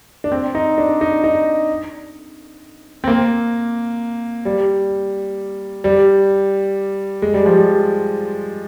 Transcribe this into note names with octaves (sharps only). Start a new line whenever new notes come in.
D4
C4
D#4
D4
D#4
D#4
C4
A#3
G3
G3
G#3
G3
F3
G3